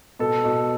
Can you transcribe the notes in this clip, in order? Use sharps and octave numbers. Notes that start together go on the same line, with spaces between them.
B2 A4
B2